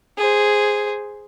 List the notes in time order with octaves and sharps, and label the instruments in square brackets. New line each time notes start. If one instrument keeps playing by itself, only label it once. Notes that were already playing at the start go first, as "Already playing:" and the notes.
[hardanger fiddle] G#4 C5